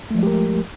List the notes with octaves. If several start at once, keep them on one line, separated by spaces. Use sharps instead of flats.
F3 G#3 A3 G4 A#4